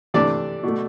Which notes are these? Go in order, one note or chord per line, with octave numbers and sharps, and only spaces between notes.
C3 E3 A3 D4 D5
B2 A3